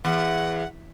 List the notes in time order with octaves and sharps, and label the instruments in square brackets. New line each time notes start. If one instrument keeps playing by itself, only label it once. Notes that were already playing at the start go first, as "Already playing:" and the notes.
[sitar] E2 [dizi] F#5